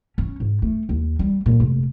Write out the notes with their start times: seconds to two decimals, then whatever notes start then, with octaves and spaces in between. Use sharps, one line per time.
0.18 C#4
0.40 G#2
0.62 A3
0.89 D#2
1.19 G3
1.46 A#2
1.60 F1